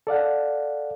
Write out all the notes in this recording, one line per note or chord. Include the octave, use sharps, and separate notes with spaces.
A4 D5 F5 F#5